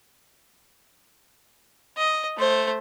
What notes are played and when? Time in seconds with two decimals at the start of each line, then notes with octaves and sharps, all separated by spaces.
1.97 D#5
2.38 A3 C5